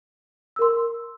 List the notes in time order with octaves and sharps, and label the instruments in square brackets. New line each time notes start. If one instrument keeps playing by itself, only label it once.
[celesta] E6
A#4
C6